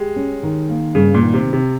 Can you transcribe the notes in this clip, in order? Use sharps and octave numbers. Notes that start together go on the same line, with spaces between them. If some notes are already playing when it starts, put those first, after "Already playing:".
Already playing: G#3 G4
C#4
D#3
A#3
G2 C#3
A#2
D#3
C3
C4
C3